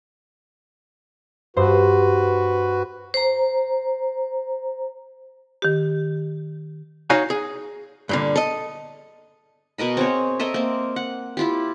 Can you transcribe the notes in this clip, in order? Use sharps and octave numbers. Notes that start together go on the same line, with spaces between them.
G2 F#4 B4 C5
C5 A#5
D#3 G4
D#4 F#4 C#5 F5 G#5
G#4
G2 A#2 D3
A4 D#5
B2 A#4 D#5 B5
C4 G#4 C#5
A4 A#4 D#5 E5
A#3 C4
F#5
E4 F4 G4